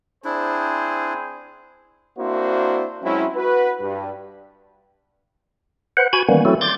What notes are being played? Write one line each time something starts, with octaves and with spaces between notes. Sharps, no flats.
C4 D4 E4 G#4 C5
A#3 C4 D4 E4 F#4 C5
F#3 G#3 C4 C#4 E4
F#4 B4
G2
B4 C5 F#5
F#4 G#5 B5 G#6
D#3 E3 G3 A#3 B3 C#4
F#3 A3 C4 E4 F#4 A4
C6 D6 G6 A6